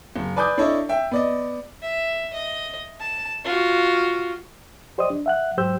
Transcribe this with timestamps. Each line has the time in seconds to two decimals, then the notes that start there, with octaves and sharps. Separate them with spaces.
0.16 F#1
0.36 B4 D5 G#5 D6 D#6 G6
0.58 D4 E4 A4 C#5 D#5
0.89 E5 G5
1.11 B3 D5 D#5
1.82 E5
2.33 D#5
3.00 A5
3.44 F4 F#4
4.98 G4 C5 D5 D#5 D#6
5.10 D4
5.26 E5 F#5 F#6
5.57 G#2 F#3 G4 C5 E6 G6